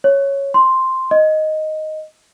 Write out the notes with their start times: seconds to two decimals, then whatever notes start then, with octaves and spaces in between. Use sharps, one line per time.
0.04 C#5
0.54 C6
1.11 D#5